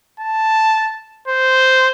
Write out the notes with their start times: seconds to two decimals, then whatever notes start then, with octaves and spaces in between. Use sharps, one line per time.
0.20 A5
1.28 C5